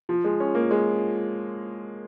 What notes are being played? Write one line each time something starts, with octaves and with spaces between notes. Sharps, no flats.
F3
G#3
C#4
A#3
G#3